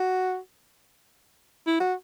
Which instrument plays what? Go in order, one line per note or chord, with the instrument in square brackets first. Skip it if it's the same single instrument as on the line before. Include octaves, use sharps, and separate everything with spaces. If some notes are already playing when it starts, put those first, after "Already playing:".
Already playing: [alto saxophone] F#4
E4
F#4